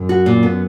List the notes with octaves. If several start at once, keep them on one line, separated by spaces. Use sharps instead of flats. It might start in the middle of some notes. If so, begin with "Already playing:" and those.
Already playing: F#2
F#4
A#2
B3